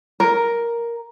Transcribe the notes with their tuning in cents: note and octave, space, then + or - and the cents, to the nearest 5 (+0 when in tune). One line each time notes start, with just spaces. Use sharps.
A#4 +5